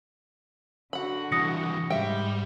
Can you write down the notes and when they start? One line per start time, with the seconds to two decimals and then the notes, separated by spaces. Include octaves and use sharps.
0.93 D3 F#4 F#5 B5
1.32 C2 E3 D#6 A#6 C#7
1.90 G#2 G3 E5 G5